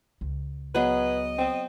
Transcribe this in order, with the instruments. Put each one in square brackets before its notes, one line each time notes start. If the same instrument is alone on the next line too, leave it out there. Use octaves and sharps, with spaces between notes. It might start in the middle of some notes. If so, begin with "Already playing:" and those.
[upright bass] C#2
[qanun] F#3 B3 G#4 [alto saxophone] B4 [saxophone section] D#5
[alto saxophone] C4